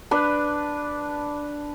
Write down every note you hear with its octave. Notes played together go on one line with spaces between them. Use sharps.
D4 B4